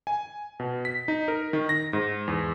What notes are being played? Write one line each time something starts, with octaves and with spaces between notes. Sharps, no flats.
G#5
B2
B6
D#4
A#4
D#3
A#6
G#2
E2